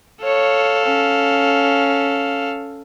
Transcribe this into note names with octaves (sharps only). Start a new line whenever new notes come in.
A4 C#5 F5
C#4